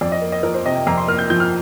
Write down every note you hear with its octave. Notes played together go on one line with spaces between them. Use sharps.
F2 D5
D#5
A#3
D#5
F3 A#4
C5
C3 D#5
G5
F2 A#5
C6
A#3 F6
G6
F3 G6
F6